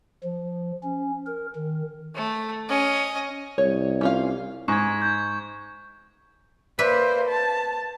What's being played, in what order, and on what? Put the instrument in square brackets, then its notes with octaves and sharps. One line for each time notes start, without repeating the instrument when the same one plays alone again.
[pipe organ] F3
C#4
A#4
D#3
[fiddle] A3
C#4 D#5
[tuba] C2 [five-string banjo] C#5
[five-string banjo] C#4 F4 F5
[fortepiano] G#2 [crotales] C#6 G#6
[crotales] G6
[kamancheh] A#3 C5 [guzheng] B4 D5 E5
[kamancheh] A5